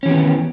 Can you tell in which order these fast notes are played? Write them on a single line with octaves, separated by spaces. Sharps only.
C#4 E3 G4 B3 D#3